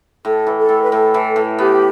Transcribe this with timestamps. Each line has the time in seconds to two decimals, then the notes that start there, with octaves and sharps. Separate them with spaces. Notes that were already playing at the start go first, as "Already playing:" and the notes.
0.24 A2 A4
0.47 E3
0.58 A4
0.69 A2
0.82 B4
0.92 A2 A4
1.14 E3
1.36 A2
1.59 B3 G4